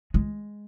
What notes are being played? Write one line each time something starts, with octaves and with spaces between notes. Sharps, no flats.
G#3